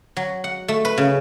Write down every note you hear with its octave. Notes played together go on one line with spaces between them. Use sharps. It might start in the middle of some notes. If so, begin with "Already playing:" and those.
F#3
F#5
A3
B4
C#3